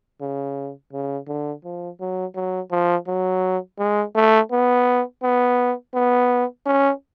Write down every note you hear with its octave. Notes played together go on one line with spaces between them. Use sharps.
C#3
C#3
D3
F3
F#3
F#3
F3
F#3
G#3
A3
B3
B3
B3
C#4